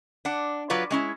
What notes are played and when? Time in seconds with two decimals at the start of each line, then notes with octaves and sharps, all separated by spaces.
0.25 D4 F#5
0.70 F#3 F4 B4 D5
0.90 G#3 C#4 E4